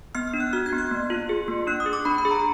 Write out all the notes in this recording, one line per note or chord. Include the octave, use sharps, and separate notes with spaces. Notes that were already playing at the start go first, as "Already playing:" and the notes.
B3 F6
F6
D4
F#6
F#4 F6
G#6
B3
F#6
A#3
F4
G#4
A#3
D4 F#6
D#6
G#4
D6
D4 B5
B5
G#4
A#5